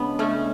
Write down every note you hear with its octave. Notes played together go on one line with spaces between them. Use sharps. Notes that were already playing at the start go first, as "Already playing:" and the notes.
Already playing: C#3 G#3 B3 D4
A3 C#4